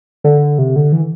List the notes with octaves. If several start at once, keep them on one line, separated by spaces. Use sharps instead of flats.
D3
C3
D3
E3